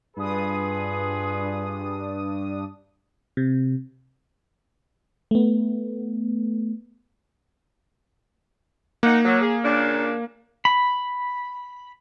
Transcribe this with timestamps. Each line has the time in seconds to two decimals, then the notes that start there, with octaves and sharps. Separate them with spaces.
0.17 G2 D4 F4 G#4 B4 D#6
3.37 C3
5.31 A3 B3
9.03 A#3 D#4 F#5
9.24 F#3
9.40 G#4
9.62 A#2 C#3 D4
10.65 B5